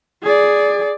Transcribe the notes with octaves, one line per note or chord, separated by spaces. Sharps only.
G#4 D5